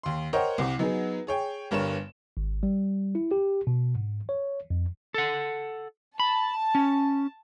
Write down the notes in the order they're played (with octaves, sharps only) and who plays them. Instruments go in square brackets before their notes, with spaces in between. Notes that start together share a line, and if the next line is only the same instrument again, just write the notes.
[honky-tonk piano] D#2 C6
A#4 C5 C#5 D#5 F#5 G5
C2 C3
F#3 B3 D#4 G#4
G#4 C#5 G5
G1 G2 A#4 C#5 E7
[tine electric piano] G#1
G3
E4
G4
B2
G#2
C#5
F2
[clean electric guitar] A4 F#5
[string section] A5 [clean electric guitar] B5
[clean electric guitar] C#4